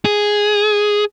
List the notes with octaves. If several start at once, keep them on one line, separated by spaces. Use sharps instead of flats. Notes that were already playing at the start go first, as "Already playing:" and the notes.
G#4